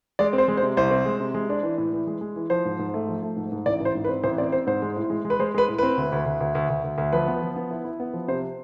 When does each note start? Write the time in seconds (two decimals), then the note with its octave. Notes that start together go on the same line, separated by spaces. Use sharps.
0.19 G#3 D5
0.33 C4
0.38 C5
0.48 G#3
0.57 C5
0.62 C3
0.77 C2 C5
0.91 C4
1.05 G#3
1.20 C3
1.34 G#3
1.49 D4
1.63 E3
1.78 A2
1.93 E3
2.07 G#3
2.21 G#3
2.36 E3
2.50 F3 C5
2.65 G#2
2.79 G#2
2.94 A3
3.08 F3
3.23 A3
3.37 G#2
3.52 G#2
3.66 A1 D5
3.80 A1 C5
3.95 G#2
4.04 B4
4.09 C4
4.24 A1 C5
4.38 C4 D5
4.52 C4 C5
4.66 G#2 C5
4.82 G#3
4.97 A2
5.10 G#3
5.25 G#3
5.30 B4
5.39 G#3 C5
5.54 G#3 B4
5.68 A2
5.78 C4 B4
5.97 D2
6.12 D2
6.26 D2
6.40 D2
6.55 D2
6.70 D2
6.84 D2
6.98 D2
7.12 F3 B4
7.28 B3
7.42 F3
7.56 B3
7.71 E4
7.85 E4
8.00 B3
8.14 F3
8.28 C3 C5